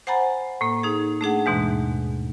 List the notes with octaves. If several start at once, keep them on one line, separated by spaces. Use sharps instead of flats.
C5 F#5 G#5 A#5 B5 A6
A2 A#3
D#4 G#4
A3 D4 G#4 F#5
D#2 G#2 B2 E3 G#3